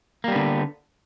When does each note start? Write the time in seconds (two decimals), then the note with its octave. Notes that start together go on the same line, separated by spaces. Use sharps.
0.24 A#3
0.28 G3
0.32 B3
0.36 D3